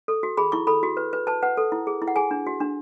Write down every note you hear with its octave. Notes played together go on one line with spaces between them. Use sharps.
A4
F#4
G#4 B5
E4 C#6
A4 B5
F#4
B4
B4
B4 A5
B4 F#5
A4
E4
G#4
E4
F#5
G#4 G#5
D4
F#4
D4